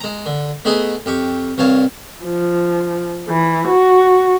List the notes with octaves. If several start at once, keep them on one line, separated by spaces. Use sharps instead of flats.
G#3 A#5
D3
A3 B3 D#4 G#4 B4 D#5
F2 G4 C#6
C2 G2 C#5 F5 A5
F3
E3
F#4